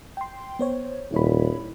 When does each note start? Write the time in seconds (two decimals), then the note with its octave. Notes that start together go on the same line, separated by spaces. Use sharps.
0.17 G5 C6
0.59 B3 C5 C#5
1.12 D#1 E4 C#5 B5